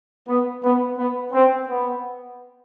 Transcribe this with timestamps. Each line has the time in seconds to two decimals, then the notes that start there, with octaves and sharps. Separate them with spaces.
0.28 B3
0.63 B3
0.98 B3
1.33 C4
1.69 B3